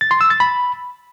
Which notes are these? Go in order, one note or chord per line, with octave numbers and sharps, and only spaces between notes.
A6
C6
E6
A6
B5